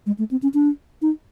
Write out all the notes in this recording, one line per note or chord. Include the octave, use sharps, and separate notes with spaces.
G#3
A3
C4
C#4
D4
D#4